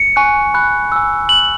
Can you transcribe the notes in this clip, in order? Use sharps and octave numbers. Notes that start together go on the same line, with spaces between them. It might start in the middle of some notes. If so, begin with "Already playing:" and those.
Already playing: C#7
G#5 C#6 F#6
B5 F#6
G#5 E6
B5 F#6 F#7